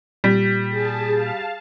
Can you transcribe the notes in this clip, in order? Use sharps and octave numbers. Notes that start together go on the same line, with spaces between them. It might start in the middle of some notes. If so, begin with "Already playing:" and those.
A#2 G3
G#4 A5
F5 A5